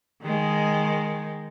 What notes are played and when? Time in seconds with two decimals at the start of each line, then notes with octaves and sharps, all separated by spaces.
0.23 D#3 G#3